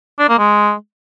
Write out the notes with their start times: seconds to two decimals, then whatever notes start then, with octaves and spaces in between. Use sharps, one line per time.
0.19 D4
0.29 A#3
0.38 G#3